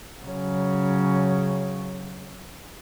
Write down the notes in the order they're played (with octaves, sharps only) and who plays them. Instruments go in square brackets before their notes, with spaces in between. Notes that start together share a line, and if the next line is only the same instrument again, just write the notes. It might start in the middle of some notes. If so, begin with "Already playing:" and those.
[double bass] C#3 F#3